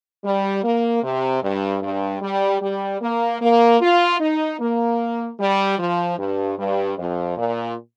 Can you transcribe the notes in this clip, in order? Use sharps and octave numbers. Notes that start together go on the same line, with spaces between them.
G3
A#3
C3
G2
G2
G3
G3
A#3
A#3
F4
D#4
A#3
G3
F3
G2
G2
F2
A#2